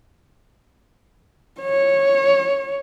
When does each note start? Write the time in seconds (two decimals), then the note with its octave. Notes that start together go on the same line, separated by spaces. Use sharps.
1.61 C#5